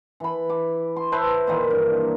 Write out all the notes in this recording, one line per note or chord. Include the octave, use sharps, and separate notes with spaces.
E3 B5
D6
C6
B4 C5 E5 A5
A#2 D#3 E3 A#3
G2